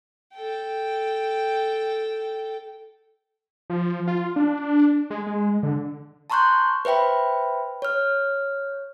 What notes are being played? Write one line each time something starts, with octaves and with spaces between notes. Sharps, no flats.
A4 G5
F3
F4
D4
G#3
G#3
D3
A5 A#5 C6 C#6 F#6 G6
B4 C5 E5 G5 B5
C#5 F6